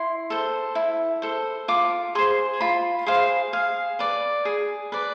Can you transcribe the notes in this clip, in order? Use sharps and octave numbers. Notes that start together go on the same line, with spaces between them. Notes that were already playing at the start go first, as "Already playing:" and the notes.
Already playing: E4 C6
A4 C5
E4
A4 C5
F4 D6
G#4 C5 C6
F4 B5
G#4 C5 F5
G#4 F5
B4 D5
G#4
B4 D5